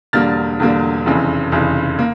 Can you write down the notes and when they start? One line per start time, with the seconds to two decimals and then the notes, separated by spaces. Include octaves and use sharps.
0.13 E1 E2 D3 G3 A#3 F6 A6
0.60 E1 E2 D3 G3 A#3
1.06 F1 F2 C#3 E3
1.52 F1 F2 C#3 E3
1.99 A#3